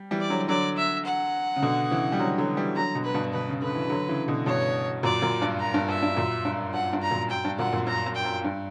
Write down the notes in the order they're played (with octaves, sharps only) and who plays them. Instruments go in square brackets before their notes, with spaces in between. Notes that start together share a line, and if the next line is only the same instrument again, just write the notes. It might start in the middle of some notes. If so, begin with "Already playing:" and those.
Already playing: [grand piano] G3
E3 G3
[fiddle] D5
[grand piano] D3 F#3
[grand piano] D3 F#3 [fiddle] D5
[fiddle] E5
F#5
[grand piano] C#3
B2 D3
C#3 E3
G3
D3 F#3
D3 F#3
E3 G3
[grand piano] D3 F#3 [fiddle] A#5
[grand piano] B2 D3
[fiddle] B4
[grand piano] G2 B2
[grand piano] B2 [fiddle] B4
[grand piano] C#3
[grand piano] D3 [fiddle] B4
[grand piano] E3
D3 F#3
C#3 E3
B2 D3
[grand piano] G2 B2 [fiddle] C#5
[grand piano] F#2 A#2 [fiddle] D5
[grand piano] F#2 A#2
G2
[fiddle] A#5
[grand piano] G2
[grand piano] G2 [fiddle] E5
[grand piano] G2
F#2 A#2
G2
[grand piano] G2 [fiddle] F#5
[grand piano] G2
[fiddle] A#5
[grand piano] F#2 A#2
[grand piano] F#2 [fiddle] G5
[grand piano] G2
[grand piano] F#2 A#2 [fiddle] F#5
[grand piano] F#2 A#2
[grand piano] F#2 [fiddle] A#5
[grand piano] F#2
[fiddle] G5
[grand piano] F#2
G2